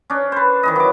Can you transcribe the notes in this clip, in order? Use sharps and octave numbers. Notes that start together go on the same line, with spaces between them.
C#4 D4
B4 C5
D#3 E3 D#5
F#3 D6